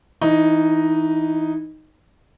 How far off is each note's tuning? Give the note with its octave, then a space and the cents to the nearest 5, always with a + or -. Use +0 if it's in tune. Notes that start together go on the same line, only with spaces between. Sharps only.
E3 -15 D#4 +0 D#5 +0